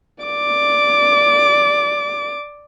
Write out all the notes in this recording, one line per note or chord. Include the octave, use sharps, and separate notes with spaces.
D5 D6